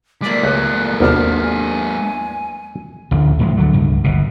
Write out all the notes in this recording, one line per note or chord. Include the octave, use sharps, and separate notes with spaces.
G#3 A#3 D5 B6
C#2 A3 F#6
G#1 D#2 G#2 C3 B3 D4 F6
G#5
A1 D2 D3
D2 A2 F3 G#3
D3 F#3
C#2 G2
G1 B2